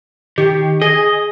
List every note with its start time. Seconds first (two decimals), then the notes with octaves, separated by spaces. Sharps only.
0.38 D#3 G4
0.82 G#4 D#5